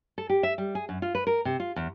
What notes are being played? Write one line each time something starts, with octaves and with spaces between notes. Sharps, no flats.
A4
G4
E5
G3
G#4
F#2
F4
B4
A#4
C3
F4
E2